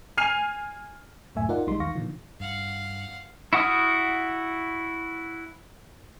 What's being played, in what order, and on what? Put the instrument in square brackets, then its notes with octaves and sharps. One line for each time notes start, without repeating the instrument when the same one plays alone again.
[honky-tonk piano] G#5 F6 C7 D#7 F7
[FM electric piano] C#2 F#2 A2 A3 E5 G#5
D#4 F4 A#4 D5 F#5
B1 F3 G3 G#3 D#4 C6
E2 D#3 F5 C#6 A#6
A#2 D3 D#3 F3
[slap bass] G2 [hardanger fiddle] F5 F#5
[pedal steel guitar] E4 F#4 F#5 D#6 F6